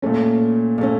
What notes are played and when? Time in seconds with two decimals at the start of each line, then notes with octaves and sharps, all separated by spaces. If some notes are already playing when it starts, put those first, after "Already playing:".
0.02 A#2 A3 C#4
0.78 A#2 A3 C#4